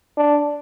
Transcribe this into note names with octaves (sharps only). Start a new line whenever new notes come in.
D4